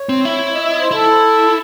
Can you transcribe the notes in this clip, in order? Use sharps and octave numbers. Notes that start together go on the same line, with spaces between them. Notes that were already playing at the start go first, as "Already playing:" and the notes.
Already playing: C#5
C4
E4
D#5
E5
D#5
C5
E4 A4